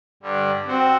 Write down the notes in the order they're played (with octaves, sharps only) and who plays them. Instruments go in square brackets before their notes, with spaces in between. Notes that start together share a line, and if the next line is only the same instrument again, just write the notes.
[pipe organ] G2 D3 G3
[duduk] C4 [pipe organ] F#4 C5